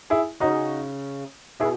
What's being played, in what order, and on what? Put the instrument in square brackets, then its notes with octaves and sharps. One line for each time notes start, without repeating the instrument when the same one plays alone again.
[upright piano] E4 G#4
[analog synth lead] C#3 [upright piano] D#4 F#4
[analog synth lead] B2 [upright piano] E4 G#4